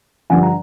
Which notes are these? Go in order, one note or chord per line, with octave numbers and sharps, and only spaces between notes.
G2 D3 F3 F#5 G#5
A#5